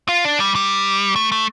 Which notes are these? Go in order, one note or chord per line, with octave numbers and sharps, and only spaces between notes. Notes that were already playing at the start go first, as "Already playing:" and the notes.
F4
D4
G3
G3
A3
A3